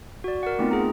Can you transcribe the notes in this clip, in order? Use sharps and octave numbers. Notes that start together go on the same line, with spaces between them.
F#4 D5
A#4 F#5
A3 B3 C4 D#4 F4
G#4 A#5